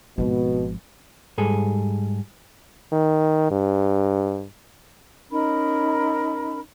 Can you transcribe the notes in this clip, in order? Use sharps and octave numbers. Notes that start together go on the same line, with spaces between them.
G#1 B2 F3
G#2 G3 G#4 A4
D#3
G2
C#4 D#4 A#4 B5